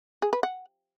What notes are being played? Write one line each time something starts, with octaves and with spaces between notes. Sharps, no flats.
G#4
B4
F#5